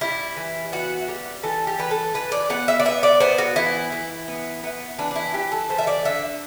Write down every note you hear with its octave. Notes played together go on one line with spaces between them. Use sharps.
G3 E4
E3
B3 F#4
G3
E3 A4
G4
E3 B4
A4
E3 B4
D5
B3 F#5
E5
D5
B3 E5
D5
B3 C5
F#4
E3 E4
E3
B3
B3
E3 D4
D4
E4
E3 G4
A4
A3 C5
E5
D5
D3 E5